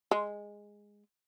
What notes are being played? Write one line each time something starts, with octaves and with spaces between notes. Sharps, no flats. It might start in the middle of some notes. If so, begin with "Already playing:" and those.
G#3